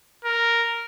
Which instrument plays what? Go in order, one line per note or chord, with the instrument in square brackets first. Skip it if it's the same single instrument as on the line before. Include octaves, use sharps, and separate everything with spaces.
[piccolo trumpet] A#4